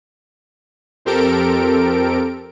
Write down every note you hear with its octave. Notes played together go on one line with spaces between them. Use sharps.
F2 C4 G4 A4 A#4 D7